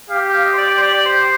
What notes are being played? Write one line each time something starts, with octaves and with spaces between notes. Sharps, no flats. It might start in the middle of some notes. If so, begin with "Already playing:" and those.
G4 F5
G5
F5
D#5
C5
D5
D5
C5
D5
D5
C5